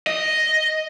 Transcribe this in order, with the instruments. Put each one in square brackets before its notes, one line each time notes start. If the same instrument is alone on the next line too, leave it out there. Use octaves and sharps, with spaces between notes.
[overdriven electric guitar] D#5